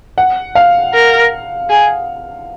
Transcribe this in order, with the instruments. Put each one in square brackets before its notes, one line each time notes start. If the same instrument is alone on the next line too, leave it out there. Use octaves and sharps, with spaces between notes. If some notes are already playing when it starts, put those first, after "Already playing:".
[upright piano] F#5
F5
[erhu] A#4
G#4